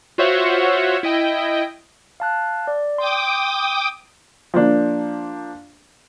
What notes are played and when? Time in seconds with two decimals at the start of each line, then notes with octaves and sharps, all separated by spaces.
0.18 F4 F#4 C5 C#5 E5 F#5
1.03 E4 D#5 G5
2.20 F5 A5 F#6
2.67 D5
2.98 G5 C6 D6 D#6
4.54 F3 A#3 D4